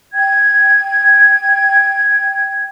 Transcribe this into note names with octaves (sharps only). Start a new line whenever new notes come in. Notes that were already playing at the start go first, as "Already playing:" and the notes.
G5 G#6